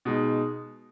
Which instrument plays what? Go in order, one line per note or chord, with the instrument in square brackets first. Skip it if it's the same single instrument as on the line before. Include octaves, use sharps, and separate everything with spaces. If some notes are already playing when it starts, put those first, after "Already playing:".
[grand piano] B2 G#3 D#4